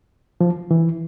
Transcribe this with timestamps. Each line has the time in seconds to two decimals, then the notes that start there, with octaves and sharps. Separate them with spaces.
0.41 F3
0.71 E3